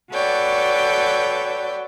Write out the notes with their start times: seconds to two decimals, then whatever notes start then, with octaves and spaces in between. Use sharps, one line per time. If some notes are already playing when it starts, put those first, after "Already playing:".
0.11 F#4 A4 B4 C#5 D5 G5